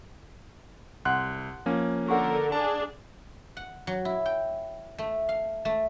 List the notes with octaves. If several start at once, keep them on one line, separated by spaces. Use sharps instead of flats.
C2 F#5 C6 F#6
F3 A#3 C#4
D3 A#4 F#5 C#6
D4 G#4 A5
F#5
F#3
E4
G5
A3
F5
A3